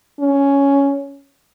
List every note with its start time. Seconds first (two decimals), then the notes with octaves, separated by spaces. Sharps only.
0.20 C#4